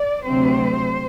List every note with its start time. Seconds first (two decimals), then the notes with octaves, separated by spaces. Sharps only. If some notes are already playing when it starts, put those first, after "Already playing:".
Already playing: D5
0.23 D2 C3 F#3 C4 C5